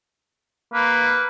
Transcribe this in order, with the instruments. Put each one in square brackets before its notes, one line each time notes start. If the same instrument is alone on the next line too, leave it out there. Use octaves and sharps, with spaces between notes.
[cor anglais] A#3 [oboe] B4